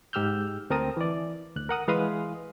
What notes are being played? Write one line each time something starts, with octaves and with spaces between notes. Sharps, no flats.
G#2 G4 E6 F6 G6
D2 C4 A#4 A5 D#6
E3 D5
D2 F#6
A#4 F#5 D#6
E3 G#3 B4 F5 C6 D#6